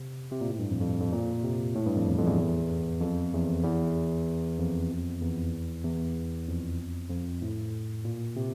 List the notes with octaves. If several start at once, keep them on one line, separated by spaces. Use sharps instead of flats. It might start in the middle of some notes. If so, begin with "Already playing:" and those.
Already playing: C3
C3
A#2
A2
G2
F2
F2
F2
A#2
C3
A2
G2
F2
E2
F2
E2
F2
E2
E2
F2
E2
E2
F2
F2
A2
A#2
C3